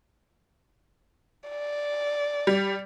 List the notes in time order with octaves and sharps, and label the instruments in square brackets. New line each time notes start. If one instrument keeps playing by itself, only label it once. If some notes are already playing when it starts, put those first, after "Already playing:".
[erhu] D5
[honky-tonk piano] G3